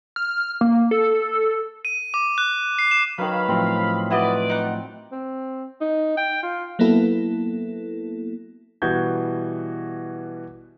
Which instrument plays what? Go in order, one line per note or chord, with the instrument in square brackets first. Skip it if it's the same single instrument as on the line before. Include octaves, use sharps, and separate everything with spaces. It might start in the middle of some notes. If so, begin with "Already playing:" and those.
[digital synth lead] F6
A#3
A4
[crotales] D#7
D6
F#6
C7
E7
[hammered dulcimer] D#3 B4 [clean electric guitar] F#3 [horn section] F5 B5
[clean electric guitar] A2 F3 F#3 [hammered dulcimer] C4
[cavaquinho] E4 F#4 D#5 [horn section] B4 D5
[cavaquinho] D#4 F#5
[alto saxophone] C4
D#4
G5
F4
[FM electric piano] F#3 A#3 B3 E4 A4
[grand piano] B2 E3 G3 F#4 G6 G#6